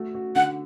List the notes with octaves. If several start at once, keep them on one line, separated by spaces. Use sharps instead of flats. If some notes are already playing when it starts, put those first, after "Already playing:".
Already playing: A3 F#4
F#4
D3 F#5